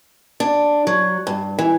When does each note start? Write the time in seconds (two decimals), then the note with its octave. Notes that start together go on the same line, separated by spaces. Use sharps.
0.40 D4
0.87 F#3
1.27 G2
1.59 E3